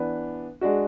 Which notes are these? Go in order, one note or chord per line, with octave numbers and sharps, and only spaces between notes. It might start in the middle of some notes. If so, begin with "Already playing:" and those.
Already playing: E3 B3 D4
G#3 D4 F#4